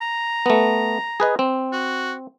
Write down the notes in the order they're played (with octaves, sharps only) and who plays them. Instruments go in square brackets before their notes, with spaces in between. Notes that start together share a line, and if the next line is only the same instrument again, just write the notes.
[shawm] A#5
[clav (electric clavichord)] A3 B3
G#4 B4 D#5
C4
[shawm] F#4